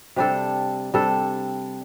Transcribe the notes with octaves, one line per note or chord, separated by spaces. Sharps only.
C3 G3 D4 A4
C3 G3 D4 A4